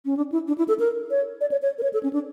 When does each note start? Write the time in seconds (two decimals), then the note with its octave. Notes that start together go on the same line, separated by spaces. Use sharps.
0.05 C#4
0.17 D4
0.32 E4
0.48 D4
0.58 E4
0.68 A4
0.79 A#4
1.11 C#5
1.41 D5
1.51 C#5
1.62 C#5
1.78 A#4
1.83 C#5
1.93 A4
2.03 C#4
2.13 D4